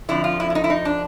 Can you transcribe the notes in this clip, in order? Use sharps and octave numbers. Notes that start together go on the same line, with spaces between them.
F2 D3 F3 E4
F4
E4
E4
D#4
E4
D#4
D4